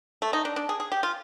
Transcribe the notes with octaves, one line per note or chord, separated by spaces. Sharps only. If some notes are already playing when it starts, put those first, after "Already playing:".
A3
D#4
D4
D4
G#4
G#4
G4
F4